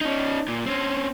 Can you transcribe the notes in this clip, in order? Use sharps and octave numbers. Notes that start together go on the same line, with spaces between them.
C#4 D#4
A#2
C4 C#4